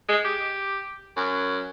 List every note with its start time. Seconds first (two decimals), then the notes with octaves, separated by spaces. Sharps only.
0.09 G#3
0.25 G4
1.17 F#2